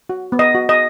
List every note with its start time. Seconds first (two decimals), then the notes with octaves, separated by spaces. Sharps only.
0.09 F#4
0.32 B3
0.39 D#5
0.55 F#4
0.69 D#5